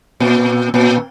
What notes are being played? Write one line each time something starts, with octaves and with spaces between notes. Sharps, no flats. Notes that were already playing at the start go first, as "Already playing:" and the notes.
A#2
A#2